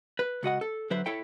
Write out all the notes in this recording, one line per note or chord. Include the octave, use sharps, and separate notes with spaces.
B4
C#2 F#4 D#5 F#5
A4
D3 F#3 B4 C5 E5
E4 A4 C#5 E5 G5